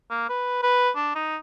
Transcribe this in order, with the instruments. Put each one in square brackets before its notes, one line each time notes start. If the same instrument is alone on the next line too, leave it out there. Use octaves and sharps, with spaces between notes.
[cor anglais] A#3
B4
B4
D4
D#4